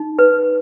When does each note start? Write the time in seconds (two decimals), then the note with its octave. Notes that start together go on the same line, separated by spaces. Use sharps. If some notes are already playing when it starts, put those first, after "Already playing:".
Already playing: D#4
0.19 B4